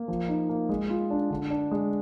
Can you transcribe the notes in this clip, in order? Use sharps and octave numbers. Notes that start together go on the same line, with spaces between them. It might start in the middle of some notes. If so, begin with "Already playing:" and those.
Already playing: A#3
F3
D#4
A#3
G#3
F4
D4
D3
D4
G#3